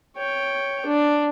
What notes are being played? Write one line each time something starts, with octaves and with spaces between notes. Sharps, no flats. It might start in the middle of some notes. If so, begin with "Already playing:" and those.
C#5 G5
D4